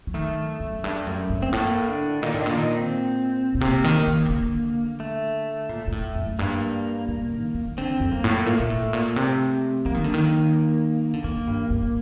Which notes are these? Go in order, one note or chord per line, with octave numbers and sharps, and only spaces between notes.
F#3
D#3 A3
F#2
G2
F#2
G2
C4
A2 A#3
D3 D4
A#2 D#3 D#4
A2
D3 D4
A#2
D#3 D#4
C4
A#2
C3 A#3
D#3
D#3
C3
D3
A3
A#2
A#2
A2
F#2
G2 A#3
A2
D#3
D#3
D3 C4
F#2
A#3
A2
A#2 A3
A#2
A2
A#2
C3
F#3 A#3
D#3
D3
D#3
D3
D#3 A#3
G2
G2